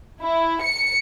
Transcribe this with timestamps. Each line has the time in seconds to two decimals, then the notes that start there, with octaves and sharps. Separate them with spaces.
0.21 E4
0.62 C#7